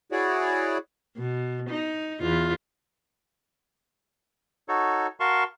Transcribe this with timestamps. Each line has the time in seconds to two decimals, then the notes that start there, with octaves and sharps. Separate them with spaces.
0.12 E4 F#4 G#4 C#5 D5
1.17 B2
1.69 D#4
2.21 E2 F4
4.69 D#4 F#4 A4 C#5
5.20 F#4 A#4 F5 A5 C6 C#6